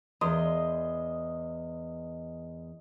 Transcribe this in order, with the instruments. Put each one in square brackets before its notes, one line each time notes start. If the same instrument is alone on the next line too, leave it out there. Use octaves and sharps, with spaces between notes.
[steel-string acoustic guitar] E2 [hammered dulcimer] D#5 C6